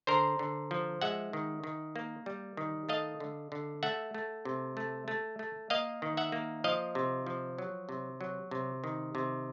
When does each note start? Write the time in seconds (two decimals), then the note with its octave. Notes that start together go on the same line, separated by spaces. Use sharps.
0.07 D3 A#4 C5
0.39 D3
0.71 F3
1.01 G#3 E5 F#5
1.33 D#3
1.64 D#3
1.96 A#3
2.26 G3
2.57 D#3
2.89 A3 D#5 F5
3.20 D3
3.52 D3
3.83 A3 E5 F#5
4.14 A3
4.45 C3
4.77 A3
5.08 A3
5.39 A3
5.70 A#3 D#5 F5
6.02 D#3
6.17 E5 F#5
6.32 A#3
6.64 F3 D#5 F5
6.95 C3
7.27 F3
7.58 F#3
7.89 C3
8.21 F#3
8.51 C3
8.84 D#3
9.15 C3